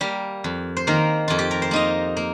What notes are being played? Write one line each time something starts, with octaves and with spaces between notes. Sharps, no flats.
G3 A#3 G4
F2
C5
D#3 A#3 A#4
F2 F4
G4
A#4
C5
A#3 D#4 D#5
A#3